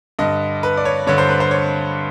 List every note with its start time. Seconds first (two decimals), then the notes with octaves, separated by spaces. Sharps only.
0.19 G2 D3 D#5
0.63 B4
0.77 D5
0.85 C#5
1.07 G2 D3 C#5
1.18 C5
1.29 B4
1.40 C5
1.51 C#5